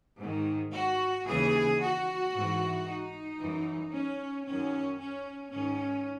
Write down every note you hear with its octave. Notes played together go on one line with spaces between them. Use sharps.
G#2 D#3
F#4
D#2 C#3 E3 G#4
F#4
G#2 E3
D#4
F#2 E3
C#4
F#2 D#3 C#4
C#4
G#2 D#3 C#4